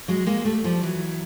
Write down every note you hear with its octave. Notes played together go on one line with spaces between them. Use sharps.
F#3 G#3
G#3 A#3
G3 A3
F3 G3
E3 F#3